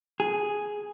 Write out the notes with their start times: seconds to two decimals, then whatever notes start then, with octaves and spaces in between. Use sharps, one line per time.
0.20 G#4